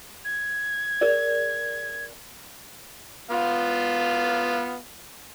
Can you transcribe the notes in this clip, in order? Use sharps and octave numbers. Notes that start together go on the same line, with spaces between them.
G#6
G#4 A#4 D5
B3 F4 F5